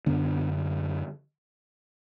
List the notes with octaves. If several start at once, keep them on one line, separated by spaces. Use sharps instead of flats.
F#2 D3 B3 D4